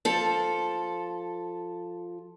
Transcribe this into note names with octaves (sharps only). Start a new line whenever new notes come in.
F3 A4